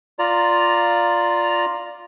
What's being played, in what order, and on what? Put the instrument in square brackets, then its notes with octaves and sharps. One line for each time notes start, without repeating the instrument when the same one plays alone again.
[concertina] F4 D5 A#5